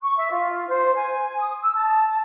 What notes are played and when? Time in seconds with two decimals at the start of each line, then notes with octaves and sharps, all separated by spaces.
0.01 C#6
0.16 E5
0.31 F4
0.67 C5
0.95 G#5
1.39 D#6
1.61 E6
1.75 A5